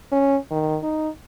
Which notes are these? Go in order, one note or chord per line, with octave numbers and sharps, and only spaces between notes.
C#4
D#3
D#4